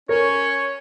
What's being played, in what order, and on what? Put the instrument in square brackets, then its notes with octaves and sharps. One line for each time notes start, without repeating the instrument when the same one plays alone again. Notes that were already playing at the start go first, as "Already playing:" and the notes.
[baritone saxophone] C#4 [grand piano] A#4 [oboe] C#5